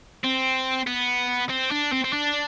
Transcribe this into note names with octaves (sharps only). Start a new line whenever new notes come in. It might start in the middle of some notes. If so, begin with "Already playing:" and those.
C4
B3
C4
D4
C4
C4
D4